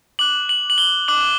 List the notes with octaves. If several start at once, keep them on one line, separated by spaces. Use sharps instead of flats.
D6 F#6 F#7
F#7
F#7
G7
D6 F#6 F#7